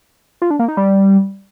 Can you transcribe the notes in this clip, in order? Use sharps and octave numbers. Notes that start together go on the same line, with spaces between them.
F4
D4
A#3
D#4
G3